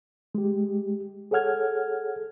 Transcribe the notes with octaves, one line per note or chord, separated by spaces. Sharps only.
G#3 G4
G#4 A4 C#5 F#5 F6 G#6